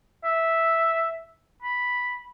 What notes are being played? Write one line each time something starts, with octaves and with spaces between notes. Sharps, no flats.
E5
B5